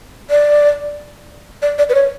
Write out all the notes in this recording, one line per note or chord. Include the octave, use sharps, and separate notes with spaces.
D5
D5
D5
B4
C#5